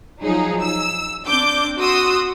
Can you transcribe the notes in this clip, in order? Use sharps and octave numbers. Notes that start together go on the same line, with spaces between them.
F3 F#3 D#4 G#4
E6
C4 D4 D6 G6
F#4 C6 D#6 E6